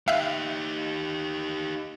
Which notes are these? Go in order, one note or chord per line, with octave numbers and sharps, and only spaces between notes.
D#4 G4 E5 F5 F#6